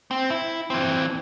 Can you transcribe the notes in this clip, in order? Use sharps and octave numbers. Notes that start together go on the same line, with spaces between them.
C4
E4
E3 C4